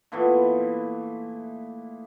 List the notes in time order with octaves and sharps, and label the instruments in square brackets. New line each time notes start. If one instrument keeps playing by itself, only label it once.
[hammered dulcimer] A#2 E3 A3 B3